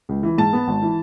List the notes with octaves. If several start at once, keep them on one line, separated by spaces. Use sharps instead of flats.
C#2
E3
G#2 A5
B3
G#1
E3